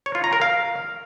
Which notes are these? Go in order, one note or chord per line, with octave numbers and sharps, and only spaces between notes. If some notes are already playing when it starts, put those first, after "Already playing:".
C#5
F4
A#5
A#4
F5